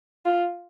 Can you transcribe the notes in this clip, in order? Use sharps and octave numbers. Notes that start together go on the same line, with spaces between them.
F4